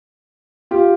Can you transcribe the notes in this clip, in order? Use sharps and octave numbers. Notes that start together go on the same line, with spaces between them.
F4 G4